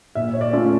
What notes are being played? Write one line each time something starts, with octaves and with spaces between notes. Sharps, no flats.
A#2 E5
C#5
D5
A3 C#4 F4